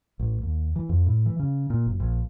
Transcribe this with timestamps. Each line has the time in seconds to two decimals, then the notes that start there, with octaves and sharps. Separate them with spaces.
0.19 A1
0.43 D#2
0.76 E3
0.89 F2
1.06 A2
1.26 E3
1.39 C#3
1.70 A#2
1.86 F#1
2.00 A#1